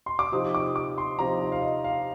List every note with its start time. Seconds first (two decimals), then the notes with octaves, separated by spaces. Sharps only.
0.06 C6
0.19 D6
0.32 C3 F3 C4 D#4 D#6
0.55 D6
0.76 D6
0.98 C6
1.19 C3 F3 C4 D#4 A#5
1.41 D#5
1.52 F5
1.62 D#5
1.84 F5